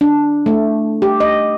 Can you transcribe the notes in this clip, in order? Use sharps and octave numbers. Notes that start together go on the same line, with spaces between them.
D4
A3
G4
D#5